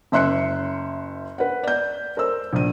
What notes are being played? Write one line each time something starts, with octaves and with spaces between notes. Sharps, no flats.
F#1 E5 C6 F#6 C#7
B4 F#5
D5 G6
A#4 C5 E6
A#1 D#7